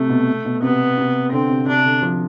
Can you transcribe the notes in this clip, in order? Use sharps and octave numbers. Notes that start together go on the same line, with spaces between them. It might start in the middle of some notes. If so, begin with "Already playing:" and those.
Already playing: C3 A3
B2
B2
C3 B3
C3
D3 C4
C3
C3 D4
D3
F3